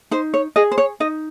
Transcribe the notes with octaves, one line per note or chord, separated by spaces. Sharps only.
D#4 C5
C#5
G#4 D#5
C5
C#5
D#4 D#5